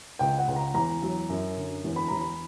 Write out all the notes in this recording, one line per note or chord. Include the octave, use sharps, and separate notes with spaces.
C#2 G5
F#5
C#2
A#5
E2 A#5
F#3
F#2
D3
E2
B5
E2 A#5
B5